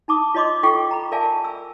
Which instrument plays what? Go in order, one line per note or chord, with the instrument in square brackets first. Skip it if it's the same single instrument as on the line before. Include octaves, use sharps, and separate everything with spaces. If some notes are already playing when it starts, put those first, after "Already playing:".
[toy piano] D#4 A5 D6 D#6
F4 C#5 D#5 C6 D6
F4 A4 G5 C#6 D6
A#5 B5
A#4 D5 E5 F5 G#5 A5
E6